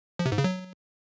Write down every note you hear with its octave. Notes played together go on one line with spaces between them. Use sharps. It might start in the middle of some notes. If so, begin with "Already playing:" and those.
F3
C3
G#2
C#3
F#3